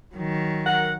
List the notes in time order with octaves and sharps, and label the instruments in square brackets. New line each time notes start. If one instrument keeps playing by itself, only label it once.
[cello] D#3 F#3
[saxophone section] A#4 F#5